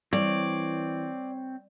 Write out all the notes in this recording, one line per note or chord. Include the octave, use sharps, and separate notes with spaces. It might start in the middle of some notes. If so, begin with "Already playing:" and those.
E3 G3 C4 C#5 D5